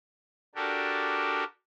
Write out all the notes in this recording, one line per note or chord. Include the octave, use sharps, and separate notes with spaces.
D4 F#4 G4 A4 A#4